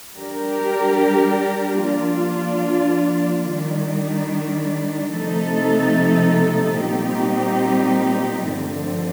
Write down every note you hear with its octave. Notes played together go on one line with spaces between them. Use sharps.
G3 D4 G4 A#4
F3 A#3 D4 F4
D#3 G3 D4
C3 F3 A3 D#4 A4
A#2 G3 C4 D#4 G4
G2 D3 F3 A3 C4